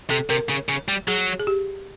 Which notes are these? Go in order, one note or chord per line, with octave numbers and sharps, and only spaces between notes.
C3 A4
C3 A#4
C#3
C#3
G3
F#3 G#4
G#4
G4